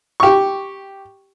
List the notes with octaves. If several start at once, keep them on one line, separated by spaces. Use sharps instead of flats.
G4 C#6